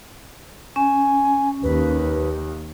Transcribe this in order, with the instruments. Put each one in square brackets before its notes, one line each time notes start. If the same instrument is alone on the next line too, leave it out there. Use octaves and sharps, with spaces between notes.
[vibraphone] C#4 [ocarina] G#5
[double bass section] D#2 [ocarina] B4